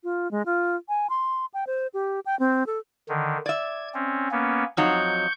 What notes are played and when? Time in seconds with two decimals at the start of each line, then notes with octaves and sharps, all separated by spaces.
0.04 F4
0.31 G#3
0.46 F4
0.89 G#5
1.10 C6
1.54 G5
1.67 C5
1.94 G4
2.26 G5
2.40 C4
2.67 A4
3.09 D3 D#3
3.46 D5 E5 G#6
3.94 C4 C#4
4.32 A#3 B3 C#4
4.77 F2 F#3 D#4 C#6 G6